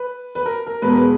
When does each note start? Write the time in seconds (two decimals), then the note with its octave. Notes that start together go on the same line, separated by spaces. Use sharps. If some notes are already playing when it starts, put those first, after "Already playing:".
Already playing: B4
0.35 B4
0.46 A#4
0.67 A#4
0.82 E1 E2 B2 G#3 B4
0.90 A#4
0.97 B4